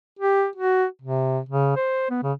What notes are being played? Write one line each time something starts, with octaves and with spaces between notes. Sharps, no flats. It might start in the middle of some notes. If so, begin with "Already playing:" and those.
G4
F#4
C3
C#3
C5
B3
C#3